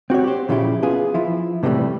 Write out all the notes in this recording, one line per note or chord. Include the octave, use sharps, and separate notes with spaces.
C4 F#4 G4 C#5
G4 C5
A#2 C#3 F3 C#4 E4 G4
B3 F4 G#4
F3 E4
A2 C3 E3 F#3 G3 A3